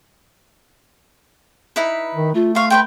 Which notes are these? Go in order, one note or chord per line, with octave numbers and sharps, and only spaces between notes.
D#4 E4 B4
D#3
A3 F4
F4 F5 C#6
B4 C#5 G5 C6